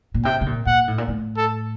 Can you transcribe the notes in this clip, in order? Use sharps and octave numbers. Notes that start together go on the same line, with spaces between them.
A#2
C3 G5
C3
A#2
A#2 F#5
A2
A#2
A2
A4